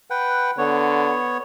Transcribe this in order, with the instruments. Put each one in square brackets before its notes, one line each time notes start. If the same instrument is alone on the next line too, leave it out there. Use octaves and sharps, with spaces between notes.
[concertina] B4 F#5 G5
[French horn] D3 [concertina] B3 C#5